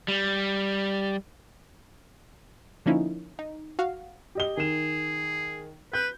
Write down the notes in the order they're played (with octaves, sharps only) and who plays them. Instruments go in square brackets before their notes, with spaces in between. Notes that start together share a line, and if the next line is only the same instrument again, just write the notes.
[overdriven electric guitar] G3
[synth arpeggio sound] D3 F3 A#3 C#4 D#4 E4
D#4
F#4 F5
[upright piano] G4 D#5 G7
[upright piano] D#3 E7 [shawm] G#4
[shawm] B4 [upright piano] G6